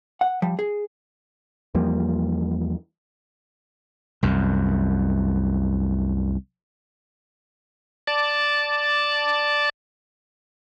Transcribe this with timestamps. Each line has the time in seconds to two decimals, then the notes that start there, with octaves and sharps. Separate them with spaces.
0.21 F#5
0.42 F3 G3
0.59 G#4
1.75 E2 F3 G3 A#3
4.23 C2 F#2
8.07 D5 A5